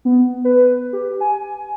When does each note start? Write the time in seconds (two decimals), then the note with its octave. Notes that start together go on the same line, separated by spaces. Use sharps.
0.05 B3
0.45 B4
0.93 G4
1.21 G#5